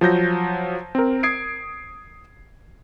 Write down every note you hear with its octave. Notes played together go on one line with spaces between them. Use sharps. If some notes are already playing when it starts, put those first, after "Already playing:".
F3 F#3 G6 A#6
C4 A#4
D#6 G#6 C7 D7